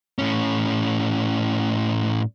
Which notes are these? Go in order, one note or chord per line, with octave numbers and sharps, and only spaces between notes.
A2 C#4